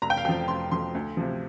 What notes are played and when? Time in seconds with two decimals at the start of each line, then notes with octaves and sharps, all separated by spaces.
0.02 F1 A#5
0.10 G5
0.17 F5
0.25 F2 F3 G5
0.48 F1 C6
0.71 F2 F3 C6
0.95 D2
1.17 C3 F3